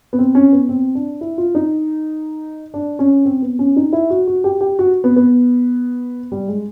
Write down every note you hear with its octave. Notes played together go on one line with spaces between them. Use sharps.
B3
C4
C#4
B3
C4
D4
E4
F4
D#4
D4
C#4
C4
B3
C#4
D#4
E4
F#4
F#4
G4
G4
F#4
B3
B3
G3
G#3